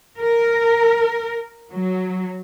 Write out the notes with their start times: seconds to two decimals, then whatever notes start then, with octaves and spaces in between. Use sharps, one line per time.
0.19 A#4
1.70 F#3